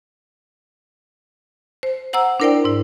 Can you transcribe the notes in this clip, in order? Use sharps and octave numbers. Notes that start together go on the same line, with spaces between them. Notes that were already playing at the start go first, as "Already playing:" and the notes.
C5
C5 F#5 A#5 E6
D4 E4 A#4 C5 D5 G5
G#2 E4